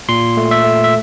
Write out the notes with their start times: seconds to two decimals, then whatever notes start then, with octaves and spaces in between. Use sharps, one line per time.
0.09 A#2 C6
0.37 A3
0.51 E5
0.65 A3
0.84 E5